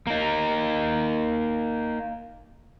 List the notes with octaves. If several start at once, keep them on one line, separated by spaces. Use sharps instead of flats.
A#3 D#4